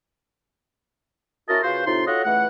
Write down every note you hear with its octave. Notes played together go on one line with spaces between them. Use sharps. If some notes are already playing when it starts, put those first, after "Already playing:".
C#4 E4 F#4 A#4 D#5 A5
C#3 F4 F#4 B4 C5
A2 C3 D#4 F4 C6
F4 F#4 A4 C#5 D#5 F#5
C#2 E3 A3 F#5